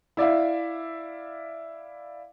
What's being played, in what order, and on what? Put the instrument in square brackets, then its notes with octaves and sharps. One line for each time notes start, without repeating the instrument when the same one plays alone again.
[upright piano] E4 D5 E5 F5